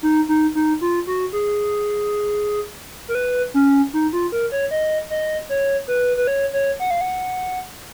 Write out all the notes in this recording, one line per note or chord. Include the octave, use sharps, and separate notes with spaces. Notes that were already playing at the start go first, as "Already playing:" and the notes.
D#4
D#4
D#4
F4
F#4
G#4
A#4
B4
C#4
D#4
F4
A#4
C#5
D#5
D#5
C#5
B4
B4
C#5
C#5
F#5
F5
F#5